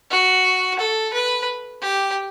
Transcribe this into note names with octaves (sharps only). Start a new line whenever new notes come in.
F#4
A4
B4
G4